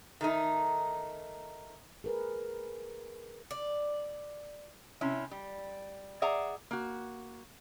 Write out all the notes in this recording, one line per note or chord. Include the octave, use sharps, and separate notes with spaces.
D#3 A3 D#4
G#4 A#4 B4
D5
C3 C#4 E4
G3
G#4 D5 E5 F#5 A#5
A#3 F#4